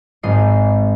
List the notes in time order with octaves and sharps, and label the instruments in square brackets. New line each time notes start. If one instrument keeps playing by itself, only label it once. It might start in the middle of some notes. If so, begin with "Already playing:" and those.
[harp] G#1 D#5 C7